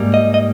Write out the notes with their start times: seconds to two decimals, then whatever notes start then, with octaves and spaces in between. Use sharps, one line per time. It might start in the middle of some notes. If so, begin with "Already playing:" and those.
Already playing: G#2 G3 A#3
0.14 D#5
0.34 D#5